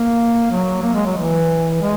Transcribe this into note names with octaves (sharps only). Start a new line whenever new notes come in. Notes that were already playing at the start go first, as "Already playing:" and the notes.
Already playing: A#3
F#3
A#3
G#3
F#3
E3
G#3